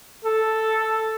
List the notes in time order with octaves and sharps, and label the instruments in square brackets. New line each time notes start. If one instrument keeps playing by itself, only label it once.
[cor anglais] A4